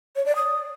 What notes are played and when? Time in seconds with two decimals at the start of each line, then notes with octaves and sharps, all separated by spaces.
0.16 C#5
0.26 D5
0.36 D#6